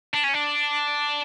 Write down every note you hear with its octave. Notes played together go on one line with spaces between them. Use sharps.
D4
C#4
D4